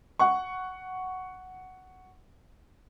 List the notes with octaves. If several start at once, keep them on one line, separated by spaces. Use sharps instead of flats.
F#5 C#6